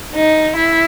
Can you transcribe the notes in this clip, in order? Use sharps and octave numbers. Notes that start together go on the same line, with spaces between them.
D#4
E4